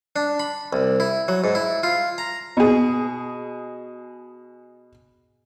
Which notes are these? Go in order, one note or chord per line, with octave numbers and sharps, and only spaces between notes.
D4
B5
C2
E4
F#3
G#2
E4
F4
A#5
B2 G#4